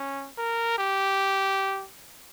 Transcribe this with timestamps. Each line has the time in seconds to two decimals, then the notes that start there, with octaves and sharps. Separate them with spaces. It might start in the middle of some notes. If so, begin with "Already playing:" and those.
Already playing: C#4
0.37 A#4
0.78 G4